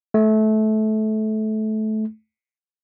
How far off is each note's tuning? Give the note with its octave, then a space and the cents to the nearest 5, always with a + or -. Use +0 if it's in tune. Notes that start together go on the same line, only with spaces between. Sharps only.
A3 -20